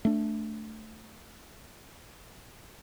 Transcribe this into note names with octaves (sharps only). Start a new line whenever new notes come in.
A3 D4